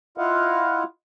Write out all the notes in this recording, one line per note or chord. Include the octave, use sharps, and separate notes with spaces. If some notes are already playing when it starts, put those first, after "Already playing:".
E4 F4 D#5 F5 F#5